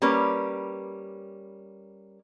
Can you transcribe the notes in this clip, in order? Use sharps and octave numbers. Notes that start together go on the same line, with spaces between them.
G3 A#3 C#4 B4